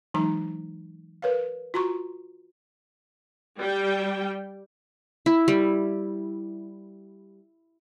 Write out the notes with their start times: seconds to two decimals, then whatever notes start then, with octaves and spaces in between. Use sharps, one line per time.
0.14 E3 F#3 G#3 D#4 A#5
1.22 A#4 B4 C#5 F5
1.74 F4 F#4 A#5 C6 C#6
3.59 G3 G5
5.26 E4
5.48 G3